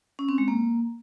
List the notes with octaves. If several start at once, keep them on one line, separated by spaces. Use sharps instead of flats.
C#4
C4
G#3
A#3